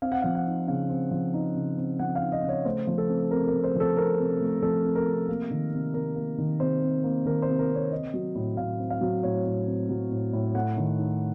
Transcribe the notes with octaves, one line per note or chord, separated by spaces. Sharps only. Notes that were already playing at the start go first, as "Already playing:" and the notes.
C4 F5
F#5
F3 F5
F#5
D#4
C#3 F5
C4
F3
D#4
C#3
C4
F3 F#5
F5
D#4
D#5
C#3
C#5
A3 C5
F3
A4
C4
C3 A#4
A#4
A3
C5
F3
A4
C4 A#4
C3
A3
F3 A4
C4
A#4
C3
A#3
D#3
C3
C3 A#4
A#3
D#3
C3 C5
C3
A#3
D#3 A#4
C5
C3
A#4
C3
C#5
C4 D#5
F#3
A2
A2 F5
C4
F5
F#3
A2 C#5
A2
C4
F#3
A2
A2
A3 F#5
D#3
D#4